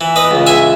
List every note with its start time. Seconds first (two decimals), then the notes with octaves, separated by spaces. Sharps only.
0.01 E3
0.16 B4 D#5
0.31 C#2
0.46 E5 G#5